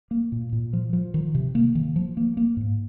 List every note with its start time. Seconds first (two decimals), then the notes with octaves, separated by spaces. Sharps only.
0.11 A#3
0.32 A#2
0.53 A#2
0.73 F3
0.93 F3
1.14 D#3
1.35 C3
1.55 A#3
1.75 D#3
1.96 F3
2.17 A#3
2.37 A#3
2.57 G#2